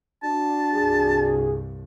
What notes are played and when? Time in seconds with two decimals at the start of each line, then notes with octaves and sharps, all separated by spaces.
0.23 D4 F#4 A5
0.74 C2 G2 G#4